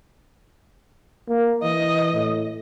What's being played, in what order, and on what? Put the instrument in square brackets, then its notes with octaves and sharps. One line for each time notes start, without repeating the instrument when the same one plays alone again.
[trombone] A#3
[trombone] E3 [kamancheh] D#5
[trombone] A2